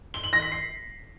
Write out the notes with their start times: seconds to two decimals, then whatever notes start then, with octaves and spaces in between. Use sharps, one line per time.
0.14 G7
0.23 F#7
0.33 A#6
0.42 B6
0.52 C7